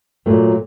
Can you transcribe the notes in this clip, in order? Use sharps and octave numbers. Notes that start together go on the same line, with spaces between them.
A#2 F#3 A3